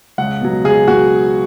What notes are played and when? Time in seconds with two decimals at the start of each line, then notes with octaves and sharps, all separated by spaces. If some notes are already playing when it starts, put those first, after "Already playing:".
0.18 C#2 F#5
0.41 B2 F#3
0.64 C#2 G#4
0.88 B2 F#3 F#4